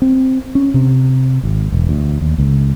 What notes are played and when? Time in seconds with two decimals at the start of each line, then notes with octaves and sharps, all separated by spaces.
0.02 C4
0.55 C#4
0.74 C3
1.43 G#1
1.72 E1
1.89 D2
2.21 D#2
2.38 C#2